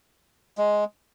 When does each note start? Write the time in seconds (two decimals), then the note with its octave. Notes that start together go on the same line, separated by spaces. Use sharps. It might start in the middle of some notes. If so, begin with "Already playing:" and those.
0.58 G#3